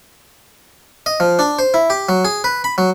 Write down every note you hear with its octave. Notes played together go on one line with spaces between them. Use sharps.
D#5
F3
D4
C5
E4
G4
F#3
G#4
B4
B5
F#3